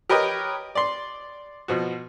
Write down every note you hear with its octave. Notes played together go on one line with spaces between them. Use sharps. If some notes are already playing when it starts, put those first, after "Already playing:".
G4 A#4 B4 C#5 D#5 G5
D5 C6
B2 F3 F#4